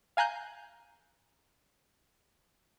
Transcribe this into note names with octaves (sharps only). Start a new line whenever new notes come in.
F5 G#5 A#5 F#6 G6